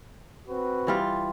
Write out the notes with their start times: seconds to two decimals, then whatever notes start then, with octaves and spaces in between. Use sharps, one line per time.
0.48 C4 F#4 B4
0.87 E3 G3 F4